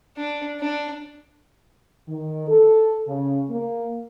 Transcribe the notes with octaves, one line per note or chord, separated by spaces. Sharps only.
D4
D4
D#3
A4
C#3
A#3